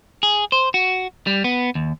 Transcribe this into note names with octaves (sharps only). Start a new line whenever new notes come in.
G#4
C5
F#4
G3
B3
D#2